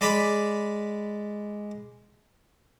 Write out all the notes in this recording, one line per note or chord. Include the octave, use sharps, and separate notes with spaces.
G#3 D5 B5